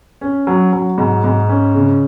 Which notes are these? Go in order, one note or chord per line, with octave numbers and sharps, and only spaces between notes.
C#4
F#3
F#3
G#2
G#2
C#4
C#3